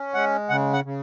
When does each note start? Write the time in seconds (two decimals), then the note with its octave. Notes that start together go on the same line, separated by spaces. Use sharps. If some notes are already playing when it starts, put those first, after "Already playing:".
Already playing: C#4
0.14 G#3 F#5
0.49 C#3 F#5
0.73 F#5
0.85 C#3